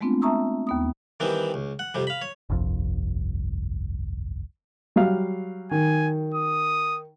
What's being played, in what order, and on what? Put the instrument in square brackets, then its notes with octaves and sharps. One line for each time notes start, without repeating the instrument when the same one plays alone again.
[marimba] G#3 A3 B3 C4 D4 F4
E5 A5 A#5 C#6 D#6 E6
D#2 B3 D#6
[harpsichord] D#3 E3 G3 B3 C4
C#2
F#5
F2 C3 G3
F5 B5
C#5
[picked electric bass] G1 C2 F2
[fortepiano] F#3 G3 F5
[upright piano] D#3 [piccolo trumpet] G#5
[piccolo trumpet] D#6